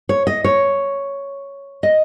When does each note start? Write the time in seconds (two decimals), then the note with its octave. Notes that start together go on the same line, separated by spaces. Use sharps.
0.09 C#5
0.27 D#5
0.44 C#5
1.83 D#5